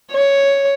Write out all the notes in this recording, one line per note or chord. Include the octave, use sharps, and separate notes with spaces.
C#5